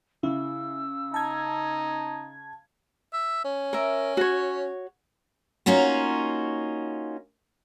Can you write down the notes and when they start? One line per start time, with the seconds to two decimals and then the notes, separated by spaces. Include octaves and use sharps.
0.23 C#3 E4 E6
1.14 D#4 A5 G#6
3.13 E5
3.44 C#4
3.73 A#4 E5
4.17 F#4 C#5
5.66 A#3 C#4 D#4 F4 F#4